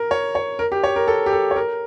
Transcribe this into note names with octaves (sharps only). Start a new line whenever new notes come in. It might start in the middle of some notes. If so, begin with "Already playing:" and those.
Already playing: A#4
C#5
C#5
A#4
G4
C#5
A#4
A4
G4
A4
C#5
A#4